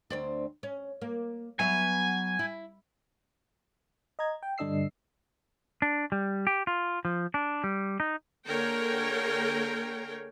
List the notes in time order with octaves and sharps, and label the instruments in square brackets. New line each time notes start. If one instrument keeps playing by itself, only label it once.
[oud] D2 C4 D5
C#4
A#3
[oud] F#3 B3 E5 [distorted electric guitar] G#5
[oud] E4
[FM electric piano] D#5 A#5 G#6
G5
G2 D3 D4 D#5 E6 C7
[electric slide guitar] D4
G3
G4
F4
F3
D4
G3
D#4
[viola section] D3 A#3 G#4 A#4 C#5 G5